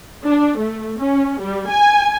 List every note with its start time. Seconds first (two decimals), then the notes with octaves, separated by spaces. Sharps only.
0.25 D4
0.57 A3
1.00 C#4
1.39 G3
1.70 G#5